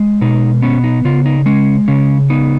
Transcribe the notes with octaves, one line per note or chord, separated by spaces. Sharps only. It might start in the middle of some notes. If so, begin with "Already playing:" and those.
Already playing: G#3
B2 D#4
B3 C#4
D#4
C#3 F4
D#4
G#3 C#4
C#3 C#4
B3 D#4